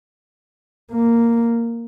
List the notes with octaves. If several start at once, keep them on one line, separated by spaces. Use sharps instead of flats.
A#3